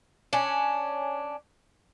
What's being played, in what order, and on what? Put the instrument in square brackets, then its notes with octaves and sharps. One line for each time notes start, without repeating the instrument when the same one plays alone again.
[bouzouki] C#4 D4